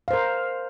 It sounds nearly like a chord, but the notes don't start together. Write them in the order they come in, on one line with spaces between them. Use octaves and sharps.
F5 C5 A#4